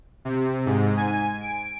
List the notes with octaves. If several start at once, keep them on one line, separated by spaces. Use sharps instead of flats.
C3
G#2
G#5
D7